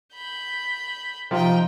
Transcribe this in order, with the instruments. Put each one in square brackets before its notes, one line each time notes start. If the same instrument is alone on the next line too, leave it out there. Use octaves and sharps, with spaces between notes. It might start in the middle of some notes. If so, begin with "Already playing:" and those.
[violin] B5 G6
[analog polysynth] C3 F3 [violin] D#4 G5